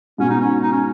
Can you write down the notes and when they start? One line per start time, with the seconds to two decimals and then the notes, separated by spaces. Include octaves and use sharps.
0.18 G#2 B2 C#4
0.29 D#4
0.40 C#4
0.62 D#4
0.72 C#4